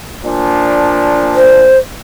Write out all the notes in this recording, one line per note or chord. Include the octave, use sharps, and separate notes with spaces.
A#2 F3 D4
C5